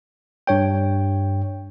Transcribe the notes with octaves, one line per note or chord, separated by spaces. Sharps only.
G2 C#5 G5